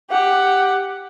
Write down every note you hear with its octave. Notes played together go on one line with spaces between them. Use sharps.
G4 F#5